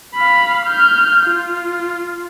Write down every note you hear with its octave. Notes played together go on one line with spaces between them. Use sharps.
F5 B5
F6 G6
F4